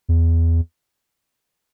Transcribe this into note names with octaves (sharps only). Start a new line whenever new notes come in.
E2